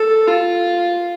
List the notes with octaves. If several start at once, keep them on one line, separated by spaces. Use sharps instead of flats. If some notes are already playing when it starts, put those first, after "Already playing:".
Already playing: A4
F4